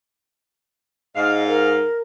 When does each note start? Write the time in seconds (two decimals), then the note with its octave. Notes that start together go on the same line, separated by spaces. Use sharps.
1.16 G#2 D#5 F5
1.47 A#4